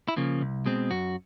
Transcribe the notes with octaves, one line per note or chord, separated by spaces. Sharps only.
E4
C#3 F3 A#3
C2
B2 G#3 C4
F#2 F#4